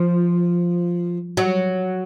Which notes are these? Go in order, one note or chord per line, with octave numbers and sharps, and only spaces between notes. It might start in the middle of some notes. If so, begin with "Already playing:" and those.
Already playing: F3
F#3